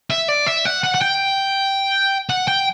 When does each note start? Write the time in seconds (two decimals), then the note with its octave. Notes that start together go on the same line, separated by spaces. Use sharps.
0.10 E5
0.28 D5
0.47 E5
0.65 F#5
0.84 F#5
0.95 F#5
1.02 G5
2.30 F#5
2.48 G5